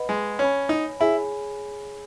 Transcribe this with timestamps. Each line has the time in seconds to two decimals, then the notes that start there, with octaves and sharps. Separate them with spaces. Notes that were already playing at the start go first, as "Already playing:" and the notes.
Already playing: B4 D#5 F#5 B5
0.09 G#3
0.39 C#4 C#5 G#5 B5
0.69 D#4
1.00 E4 G#4 C#5 G#5 B5